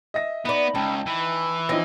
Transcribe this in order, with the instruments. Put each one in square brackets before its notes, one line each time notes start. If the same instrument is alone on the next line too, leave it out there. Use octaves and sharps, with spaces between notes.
[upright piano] D#5 E5 A#6
[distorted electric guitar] B3 [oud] D#4 D5 [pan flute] B5
[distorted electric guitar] C#2 [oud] D#4 [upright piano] G5 A5
[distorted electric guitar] E3 [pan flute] B5
[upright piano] F3 D#4 A#6 [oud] C4 C#4